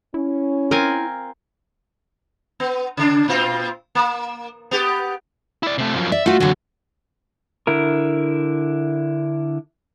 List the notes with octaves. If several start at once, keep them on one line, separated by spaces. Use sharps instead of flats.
C#4 E4
C4 F4 A#4 G#5
B3
C#3 D4
A#2 C4 F4
A#3
B3 G4
E4 D5
C3 A3
F#2 F3
D5 E5
A3 F4 F#4
D#2 D3 F#3 F#4
D3 E4 A#4